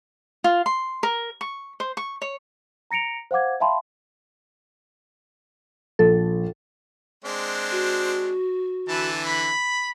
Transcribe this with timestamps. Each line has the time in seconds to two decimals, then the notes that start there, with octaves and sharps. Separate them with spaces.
0.44 F4
0.66 C6
1.03 A#4
1.41 C#6
1.80 C5
1.97 C#6
2.22 C#5
2.91 A#5 A#6 C#7 D7 F7
3.31 C5 F5 F#5 D6 G#6
3.60 E5 F5 G5 A5 B5 C6
5.99 A#1 A4
7.24 G#3 C4 D4
7.71 F#4
8.89 D3 E3 A4 B4 A5
9.26 B5